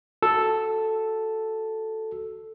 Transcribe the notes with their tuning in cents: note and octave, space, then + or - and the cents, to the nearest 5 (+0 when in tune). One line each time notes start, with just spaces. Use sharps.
F#4 +0 A4 +0